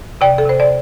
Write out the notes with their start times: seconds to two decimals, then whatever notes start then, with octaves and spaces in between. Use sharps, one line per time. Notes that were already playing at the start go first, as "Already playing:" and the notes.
0.21 C3 D5 G5
0.38 A4
0.46 C3 C5
0.60 D5